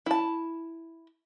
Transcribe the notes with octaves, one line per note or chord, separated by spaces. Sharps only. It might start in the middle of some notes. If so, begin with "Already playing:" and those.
E4 A5